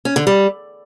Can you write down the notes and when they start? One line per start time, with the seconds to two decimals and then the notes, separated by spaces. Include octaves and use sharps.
0.05 C#4
0.16 D3
0.27 G3